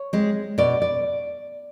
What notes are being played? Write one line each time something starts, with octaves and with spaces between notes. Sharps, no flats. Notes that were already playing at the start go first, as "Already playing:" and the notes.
Already playing: C#5
G#3 C4
B2 D5
D5